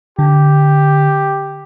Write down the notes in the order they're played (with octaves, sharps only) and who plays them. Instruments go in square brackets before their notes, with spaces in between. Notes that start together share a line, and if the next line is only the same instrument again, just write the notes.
[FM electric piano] D3 [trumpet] G4